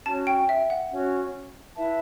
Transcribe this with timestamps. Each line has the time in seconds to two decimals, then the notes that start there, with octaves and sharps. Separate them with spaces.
0.06 C#4 F#4 C#5 A5
0.27 G5
0.49 E5
0.70 F#5
0.91 C#4 F#4 C#5
1.76 E4 B4 E5 A5